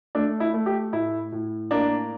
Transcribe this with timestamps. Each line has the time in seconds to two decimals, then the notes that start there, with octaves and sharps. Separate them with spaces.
0.15 A3 D4
0.40 E4
0.54 A3
0.66 G4
0.93 A2 E4
1.32 A2
1.71 A#3 D4